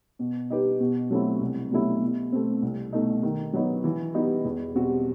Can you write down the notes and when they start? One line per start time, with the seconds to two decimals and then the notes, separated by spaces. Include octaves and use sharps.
0.19 B2
0.50 G3 D#4 G4 B4
0.80 B2
1.11 F#3 A3 C4 E4
1.41 C2
1.71 B2 F#3 A3 E4
2.02 B2
2.32 A3 C4
2.62 C2
2.93 B2 A3 D#4
3.23 D#3
3.53 F#3 B3 D#4
3.84 E3
4.14 G3 B3 D#4 F#4
4.45 E2
4.75 B2 G3 C4 F#4